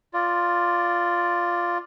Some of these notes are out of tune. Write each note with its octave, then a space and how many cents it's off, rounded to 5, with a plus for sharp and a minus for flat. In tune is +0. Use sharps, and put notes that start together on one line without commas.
F4 +0 D5 +0